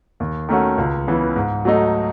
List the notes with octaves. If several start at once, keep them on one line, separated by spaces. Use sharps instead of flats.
D#2
D#3 A3 C#4 F#4
C#2
C#3 E3 B3
G#2
F#3 A3 D#4